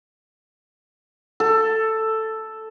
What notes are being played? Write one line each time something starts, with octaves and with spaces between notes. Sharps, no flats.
A4